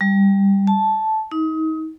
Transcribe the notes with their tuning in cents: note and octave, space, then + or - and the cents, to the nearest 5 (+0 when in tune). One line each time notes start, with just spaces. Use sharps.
G3 +10
A5 -10
D#4 +30